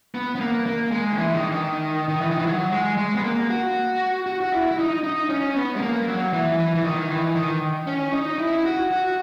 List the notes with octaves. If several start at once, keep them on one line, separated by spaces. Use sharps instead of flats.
B3
B3
A#3
A#3
G#3
D#3
E3
D#3
D#3
D#3
E3
D#3
E3
F#3
G#3
G#3
B3
A#3
F#4
F#4
F#4
E4
E4
D#4
D#4
C#4
B3
G#3
A#3
F#3
E3
E3
E3
D#3
E3
D#3
C#4
D#4
E4
F#4
F#4